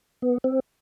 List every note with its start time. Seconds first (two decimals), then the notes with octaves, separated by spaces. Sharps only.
0.22 B3
0.44 C4